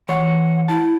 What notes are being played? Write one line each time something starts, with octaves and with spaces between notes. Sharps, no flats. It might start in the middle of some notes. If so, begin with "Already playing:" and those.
E3 C#5 F#5 C6
E4 A5